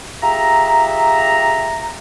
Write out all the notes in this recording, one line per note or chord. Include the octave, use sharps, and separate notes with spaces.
F4 G4 G#4 E5 A#5